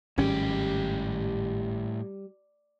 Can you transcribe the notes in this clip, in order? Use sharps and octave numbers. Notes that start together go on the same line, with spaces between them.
G#1 A2 G3 C#4 G4